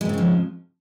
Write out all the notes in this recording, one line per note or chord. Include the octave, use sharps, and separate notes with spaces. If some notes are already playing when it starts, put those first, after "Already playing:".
G#2 C#3 F3 G#3 C4